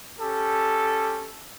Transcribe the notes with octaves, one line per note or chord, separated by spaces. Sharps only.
C#4 G4 A4